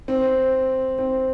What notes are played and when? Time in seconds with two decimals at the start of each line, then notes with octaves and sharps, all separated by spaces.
0.08 C4
0.99 C4